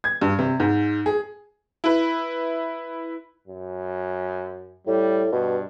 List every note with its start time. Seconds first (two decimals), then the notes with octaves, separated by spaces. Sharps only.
0.04 G#6
0.21 G2
0.39 C3
0.60 G#2
1.06 G#4
1.84 E4 B4
3.48 F#2
4.87 A2 G3
5.32 G2 B2